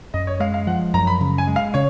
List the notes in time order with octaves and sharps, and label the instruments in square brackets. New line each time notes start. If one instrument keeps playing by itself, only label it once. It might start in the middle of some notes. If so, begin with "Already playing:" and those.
[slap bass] F#2 [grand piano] D#5
[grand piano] C#5
[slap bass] G#3 [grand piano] F5
[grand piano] F5
[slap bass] F3 [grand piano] F#5
[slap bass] F#2 [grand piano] A#5
[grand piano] B5
[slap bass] C#3
[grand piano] G#5
[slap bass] G#3
[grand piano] F5
[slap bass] C#3 [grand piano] C#5